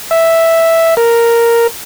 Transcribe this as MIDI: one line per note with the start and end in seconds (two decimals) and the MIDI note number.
0.11 0.95 76
0.97 1.67 70